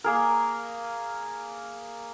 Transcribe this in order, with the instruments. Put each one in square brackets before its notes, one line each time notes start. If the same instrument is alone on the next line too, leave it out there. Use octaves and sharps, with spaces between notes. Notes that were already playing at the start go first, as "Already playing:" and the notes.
[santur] A#3 G#4 A#4